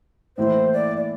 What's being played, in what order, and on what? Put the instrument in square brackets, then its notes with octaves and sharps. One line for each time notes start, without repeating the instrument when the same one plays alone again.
[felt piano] A2 E3 A#3 E4 [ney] C5
[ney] D5
D5